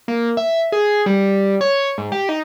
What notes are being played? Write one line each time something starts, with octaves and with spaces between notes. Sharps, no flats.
A#3
E5
G#4
G3
C#5
G#2
G4
D#4